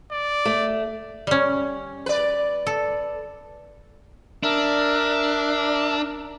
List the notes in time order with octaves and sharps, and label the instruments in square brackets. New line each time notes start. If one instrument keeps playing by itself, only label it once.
[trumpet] D5
[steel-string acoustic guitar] A3
[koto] G3 C#4
[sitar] B4 D5
[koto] A4
[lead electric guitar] D4 [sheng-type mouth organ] A#4 E5